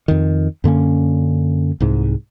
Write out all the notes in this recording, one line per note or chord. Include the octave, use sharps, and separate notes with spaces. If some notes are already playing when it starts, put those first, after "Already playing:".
F2 D#3
F#2 D3 A#3 C#4
C2 G#2